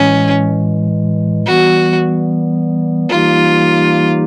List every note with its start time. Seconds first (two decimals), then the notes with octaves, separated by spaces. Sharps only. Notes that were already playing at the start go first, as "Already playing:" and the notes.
Already playing: A2 E3 G#3 C#4
1.45 E3 G3 B3 F#4
3.09 E3 G3 A#3 D#4 F4 G4